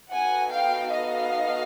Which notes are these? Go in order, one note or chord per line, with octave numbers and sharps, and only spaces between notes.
B3 D#4 F#4 A4 F#5 G#5
F5 G5
D#5 F5